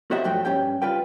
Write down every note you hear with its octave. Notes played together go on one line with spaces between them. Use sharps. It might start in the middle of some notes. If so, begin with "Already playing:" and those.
F#4 G4 C5 D#5 E5 F#5
B1 G2 F3 A3 F#4 G5
G2 D#3 C#4 G4 G5
G3 F4 B4 G5